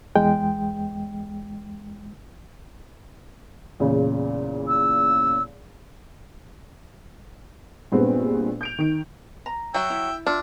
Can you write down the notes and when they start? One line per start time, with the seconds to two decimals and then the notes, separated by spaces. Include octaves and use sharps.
0.16 E2 G#3 G5
3.80 E2 A#2 C#3
4.68 E6
7.92 G2 A#2 G#3 B3 C4
8.61 G6 D7 F7
8.78 D#3 D7
9.46 A#5
9.74 F#3 F#4 E5 G5
9.90 E4
10.26 D4 F4 E5